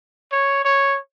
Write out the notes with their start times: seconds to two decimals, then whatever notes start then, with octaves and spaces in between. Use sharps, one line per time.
0.32 C#5
0.65 C#5